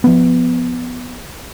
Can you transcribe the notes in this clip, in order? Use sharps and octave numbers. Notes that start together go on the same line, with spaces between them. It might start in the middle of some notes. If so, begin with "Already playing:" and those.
F3 B3